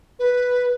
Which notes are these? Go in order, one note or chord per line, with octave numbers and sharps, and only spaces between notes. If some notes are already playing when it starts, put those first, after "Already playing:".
B4